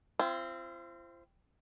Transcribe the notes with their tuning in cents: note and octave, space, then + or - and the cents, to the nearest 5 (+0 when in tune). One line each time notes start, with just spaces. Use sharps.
C4 +0 F4 -40